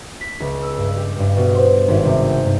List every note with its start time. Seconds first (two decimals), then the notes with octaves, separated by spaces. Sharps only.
0.21 B6
0.40 C#2
0.62 E6
0.78 G2
0.96 G4
1.19 G2
1.37 B2
1.55 C5
1.88 G#1
2.05 C3
2.28 G6
2.45 G2